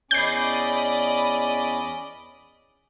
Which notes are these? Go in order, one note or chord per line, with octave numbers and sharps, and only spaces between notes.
E2 C#4 D5 D#5 B5 G6 C7